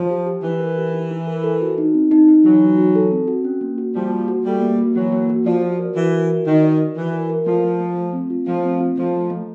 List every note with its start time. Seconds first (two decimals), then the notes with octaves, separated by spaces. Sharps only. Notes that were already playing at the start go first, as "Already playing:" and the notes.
Already playing: F3
0.10 G4
0.26 G4
0.43 E3 E4
0.60 A#4
0.78 G4
0.94 E4
1.11 E4
1.27 A#4
1.44 A4
1.61 F#4
1.78 D#4
1.94 C4
2.11 D#4
2.28 D#4
2.44 E3 F#3 F#4
2.61 D#4
2.78 F#4
2.95 A4
3.11 C4
3.28 F#4
3.45 C#4
3.61 A#3
3.78 F#4
3.95 F3 G3 A#3
4.11 A#3
4.28 F#4
4.45 G3 A3 A#3
4.62 A#3
4.78 F#4
4.95 E3 F#3 A#3
5.12 A#3
5.29 F#4
5.45 F3 D5
5.63 F#4
5.79 A#4
5.96 E3 F#4
6.13 A#4
6.30 F#4
6.46 D#3 F#4
6.63 D5
6.79 D5
6.96 E3 F#4
7.13 A#4
7.30 A#4
7.46 F3 A3
7.64 A3
7.80 A3
7.96 A3
8.13 C4
8.30 F4
8.47 F3 A3
8.64 C4
8.81 F4
8.97 F3 A3
9.15 A3
9.30 A3